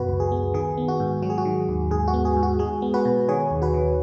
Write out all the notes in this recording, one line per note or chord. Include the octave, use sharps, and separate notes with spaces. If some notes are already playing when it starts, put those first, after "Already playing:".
Already playing: F#2 B2 F#4 B4
C#2
G#4
B3
D#3 G#4
B3
F#4
G#2
F#3 F#4
G#4
F#4
D#3
D#2
G#2 G#4
F#4
B3
G#4
G#2
F#4
G#3 G#4
B3
F#4 B4
B2
D#3 G#4 C#5
D#2
F#4 B4
D#3